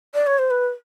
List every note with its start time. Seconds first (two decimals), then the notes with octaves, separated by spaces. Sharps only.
0.14 D5
0.27 C#5
0.39 C5
0.51 B4